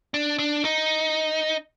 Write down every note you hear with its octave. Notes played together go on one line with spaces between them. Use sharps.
D4
D4
D#4